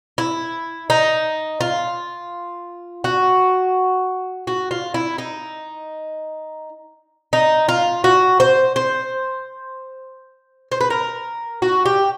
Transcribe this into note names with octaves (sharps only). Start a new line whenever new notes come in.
E4
D#4
F4
F#4
F#4
F4
E4
D#4
D#4
F4
F#4
C5
C5
C5
B4
A#4
F#4
G4